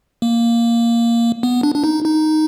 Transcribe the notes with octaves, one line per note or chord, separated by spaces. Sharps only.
A#3
B3
D4
D4
D#4
D#4